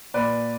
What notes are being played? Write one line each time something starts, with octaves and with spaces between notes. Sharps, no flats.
A#2 B4 D5